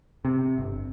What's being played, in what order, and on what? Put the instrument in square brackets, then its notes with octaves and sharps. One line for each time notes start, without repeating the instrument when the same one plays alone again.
[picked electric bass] C3
G1